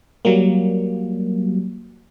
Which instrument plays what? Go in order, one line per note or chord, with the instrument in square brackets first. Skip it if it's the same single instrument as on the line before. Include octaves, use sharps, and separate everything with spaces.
[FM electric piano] F#3 G3 A#3